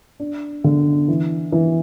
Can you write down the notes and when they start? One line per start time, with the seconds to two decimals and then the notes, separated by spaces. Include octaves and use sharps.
0.20 D4
0.64 D3
1.08 E3
1.52 E3